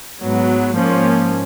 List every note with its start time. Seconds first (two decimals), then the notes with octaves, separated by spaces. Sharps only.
0.22 G#2 F#3 B3
0.77 G#2 F3 A#3 C#4